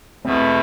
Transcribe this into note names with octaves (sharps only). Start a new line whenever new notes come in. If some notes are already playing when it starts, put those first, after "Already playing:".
E2 B2 A3 C4